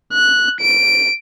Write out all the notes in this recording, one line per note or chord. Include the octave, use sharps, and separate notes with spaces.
F#6
D7